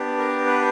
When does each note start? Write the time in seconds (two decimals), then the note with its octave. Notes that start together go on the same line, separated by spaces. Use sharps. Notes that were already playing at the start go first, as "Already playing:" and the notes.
Already playing: B3 D4 G4
0.19 A#4
0.46 B4